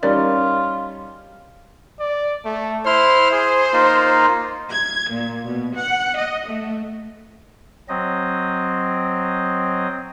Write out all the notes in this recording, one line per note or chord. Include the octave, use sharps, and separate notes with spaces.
G3 C#4 D#4 F4 A#4 C#5 D5
D5
A3
E4 C5 C6 F6
G#4
A#3 D#4 F4
G#6
A#2
B2
F#5
D#5
A3
F#3 C4 D#5